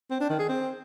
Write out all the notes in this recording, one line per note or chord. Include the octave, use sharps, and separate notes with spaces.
C4
D4
D#3
G#4
C4